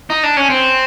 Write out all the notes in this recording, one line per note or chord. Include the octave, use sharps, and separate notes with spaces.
D#4
D4
C#4
C4